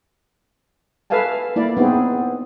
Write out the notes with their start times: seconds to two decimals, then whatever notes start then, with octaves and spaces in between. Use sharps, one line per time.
1.10 A4 B4 E5 F5 G#5 A5
1.56 A#3 E4 D5
1.77 B3 C4 D#4 G#4